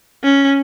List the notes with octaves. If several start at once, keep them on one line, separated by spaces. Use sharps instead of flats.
C#4